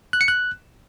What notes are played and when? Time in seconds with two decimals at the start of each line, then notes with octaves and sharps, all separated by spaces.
0.13 F#6
0.21 C#7
0.28 F#6